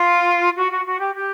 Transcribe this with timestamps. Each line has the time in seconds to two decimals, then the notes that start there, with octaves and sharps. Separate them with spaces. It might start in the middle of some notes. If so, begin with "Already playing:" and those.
Already playing: F4
0.56 F#4
0.71 F#4
0.86 F#4
0.99 G4
1.15 G4